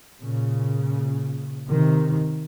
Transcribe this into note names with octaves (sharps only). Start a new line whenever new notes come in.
A#2 C#3
C3 D#3